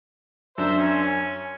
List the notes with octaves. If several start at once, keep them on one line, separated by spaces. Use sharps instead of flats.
F#2 D4 C5 E5
C#4
G#5